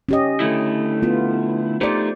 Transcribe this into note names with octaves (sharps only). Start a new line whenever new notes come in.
C#4 G4 D#5
D3 A3 E4
B3 F4
A3 D#4 G4 C5 D5